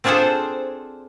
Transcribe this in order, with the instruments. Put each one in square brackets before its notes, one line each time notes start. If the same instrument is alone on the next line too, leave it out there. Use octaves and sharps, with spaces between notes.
[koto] C4 D4 F4 G#4 A4 C5